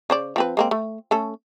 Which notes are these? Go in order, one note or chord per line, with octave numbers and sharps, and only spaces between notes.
C#3 C5 D5
F3 C4 B4
G#3 A#3 C4
A3
A3 C#4 A4